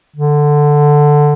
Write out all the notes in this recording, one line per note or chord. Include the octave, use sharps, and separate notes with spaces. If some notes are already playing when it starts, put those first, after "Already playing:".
D3